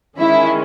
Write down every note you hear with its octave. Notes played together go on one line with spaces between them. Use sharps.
D#3 G#3 C#4 E4